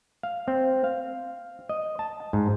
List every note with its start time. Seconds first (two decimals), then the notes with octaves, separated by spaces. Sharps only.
0.23 F5
0.48 C4
0.84 F5
1.69 D#5
1.99 A5
2.33 G#2